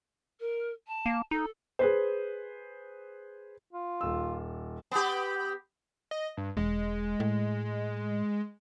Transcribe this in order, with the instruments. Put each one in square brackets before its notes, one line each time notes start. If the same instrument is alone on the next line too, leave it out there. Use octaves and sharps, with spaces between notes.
[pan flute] A#4
A5
[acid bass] A#3
[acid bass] D#4 [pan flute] A4
[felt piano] G#4 B4 C5
[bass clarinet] F4
[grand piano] D#1 E6
[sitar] B3 G4
[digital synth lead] D#5
G2
[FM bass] E1 [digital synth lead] G#3
[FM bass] A2